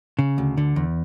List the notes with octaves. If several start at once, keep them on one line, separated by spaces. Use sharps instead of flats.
C#3
D2
D3
E2